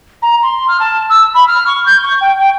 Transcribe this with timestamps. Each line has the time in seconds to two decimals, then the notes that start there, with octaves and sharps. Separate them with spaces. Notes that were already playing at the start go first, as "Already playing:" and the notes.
0.22 A#5
0.43 C6
0.68 F6
0.80 A5
1.10 E6
1.34 B5
1.47 F6
1.67 C#6
1.86 G6
2.04 C#6
2.21 G5
2.38 G5